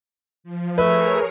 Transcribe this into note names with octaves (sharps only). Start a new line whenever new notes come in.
F3
A3 G#4 A#4 B4 C#5 E5